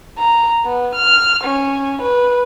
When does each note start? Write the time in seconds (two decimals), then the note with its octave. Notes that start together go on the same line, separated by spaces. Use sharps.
0.18 A#5
0.65 B3
0.95 F6
1.44 C#4
2.02 B4